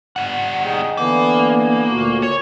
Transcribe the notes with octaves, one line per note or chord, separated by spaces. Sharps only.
G3 F#5
D#4 G#4 G5
D3 E3 A#3 B3
D2 A#2 F#4
C#5